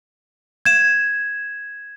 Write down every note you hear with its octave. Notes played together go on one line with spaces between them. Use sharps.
G#6 E7